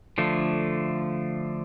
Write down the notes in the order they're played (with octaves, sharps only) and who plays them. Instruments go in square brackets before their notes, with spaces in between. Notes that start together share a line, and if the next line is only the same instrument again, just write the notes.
[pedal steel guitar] D3 F3 A3 D4